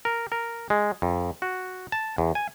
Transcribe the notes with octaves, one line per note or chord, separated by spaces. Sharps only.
A#4
A#4
G#3
F2
F#4
A5
E2
G#5